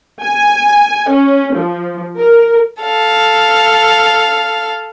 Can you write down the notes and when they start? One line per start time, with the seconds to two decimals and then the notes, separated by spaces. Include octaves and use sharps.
0.21 G#5
1.08 C#4
1.54 F3
2.18 A#4
2.81 A4 F5